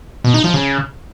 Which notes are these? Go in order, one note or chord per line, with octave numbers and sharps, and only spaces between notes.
B2
D#4
F3
C#3